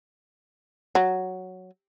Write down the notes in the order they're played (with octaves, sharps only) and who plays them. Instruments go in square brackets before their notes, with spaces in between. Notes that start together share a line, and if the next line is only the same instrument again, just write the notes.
[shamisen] F#3